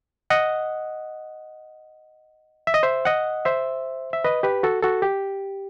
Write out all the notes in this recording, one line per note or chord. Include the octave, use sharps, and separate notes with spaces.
D#5 F#5
E5
D#5
C5 E5
D#5 F#5
C5 E5
E5
B4 D#5
G4 B4
F#4 A4
F#4 A4
G4